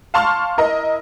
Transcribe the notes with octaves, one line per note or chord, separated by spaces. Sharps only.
F5 A5 C6 C#6 F6
E4 A#4 D#5